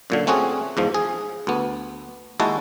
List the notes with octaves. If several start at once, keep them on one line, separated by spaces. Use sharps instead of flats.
F#2 A#2 D3
A3 C4 C#4 F#4 G#4
E2 G#2 F3
G#4
D2 B3
D#2 G#3 E4 F#4 A5